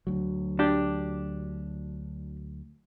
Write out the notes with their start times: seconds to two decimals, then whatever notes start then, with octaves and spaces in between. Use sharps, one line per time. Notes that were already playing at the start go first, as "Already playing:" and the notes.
0.07 D2 F#3
0.59 D4 G4